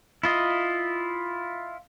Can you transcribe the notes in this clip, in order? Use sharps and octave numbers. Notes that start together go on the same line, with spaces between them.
E4 F4 D#5